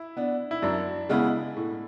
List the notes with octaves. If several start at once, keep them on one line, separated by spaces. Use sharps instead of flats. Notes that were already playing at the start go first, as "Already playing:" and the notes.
Already playing: E4
B3 D4
E4
F#2 D4
C#3 G#3 B3 E4
A2